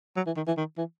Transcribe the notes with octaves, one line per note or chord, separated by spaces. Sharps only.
F#3
E3
D#3
E3
D#3
E3